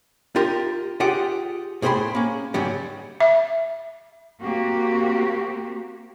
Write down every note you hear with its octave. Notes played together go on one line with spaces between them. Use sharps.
F4 G4 A#4 C6
F4 G4 G#4 F#5 G5
A2 G#4 C5 G5 B5 C6
A#3 C#4
G#2 C#3 F#3 G3
E5
A#3 C4 F#4 G4